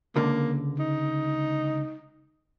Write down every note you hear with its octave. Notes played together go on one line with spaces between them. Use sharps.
C#2 D3 A#3
D#4